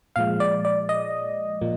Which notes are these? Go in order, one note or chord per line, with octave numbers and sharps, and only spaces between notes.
A#2 F3 G#3 F5
D5
D5
D#5
A#2 F3 A#3